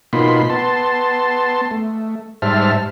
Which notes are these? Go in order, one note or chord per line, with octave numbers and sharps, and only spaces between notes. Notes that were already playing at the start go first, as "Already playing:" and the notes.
B2 A#3 D#4 F4 B5 C6
B3 A5 C6
A3
G#2 G3 C5 E5 A5 F6